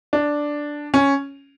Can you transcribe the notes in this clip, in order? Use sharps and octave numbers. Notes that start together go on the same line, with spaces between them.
D4
C#4